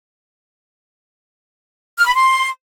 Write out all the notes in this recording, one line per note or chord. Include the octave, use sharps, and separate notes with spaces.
F6
B5
C6